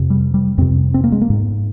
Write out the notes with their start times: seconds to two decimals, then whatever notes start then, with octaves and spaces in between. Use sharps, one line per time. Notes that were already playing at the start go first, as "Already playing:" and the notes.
Already playing: F2 C3
0.10 G3
0.34 G3
0.58 F2 C3 C4
0.94 C4
1.04 A#3
1.12 G#3
1.21 A#3
1.30 G#2